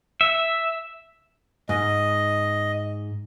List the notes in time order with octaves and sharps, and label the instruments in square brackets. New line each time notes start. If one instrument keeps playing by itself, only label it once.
[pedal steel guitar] E5
[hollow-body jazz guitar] G#2 [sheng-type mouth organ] D#5